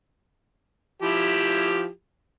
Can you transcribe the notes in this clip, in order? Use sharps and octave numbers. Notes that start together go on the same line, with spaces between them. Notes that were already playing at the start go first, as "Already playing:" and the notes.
F3 E4 G4